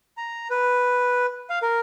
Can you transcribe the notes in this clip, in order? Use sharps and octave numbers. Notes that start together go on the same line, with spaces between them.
A#5
B4
F5
A#4